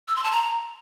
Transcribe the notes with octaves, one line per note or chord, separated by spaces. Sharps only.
E6
C6
A5
A#5